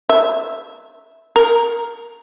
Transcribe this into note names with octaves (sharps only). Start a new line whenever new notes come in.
E5
A#4